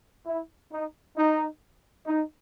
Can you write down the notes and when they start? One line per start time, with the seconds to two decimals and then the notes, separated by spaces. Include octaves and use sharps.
0.27 E4
0.71 D#4
1.17 D#4
2.06 D#4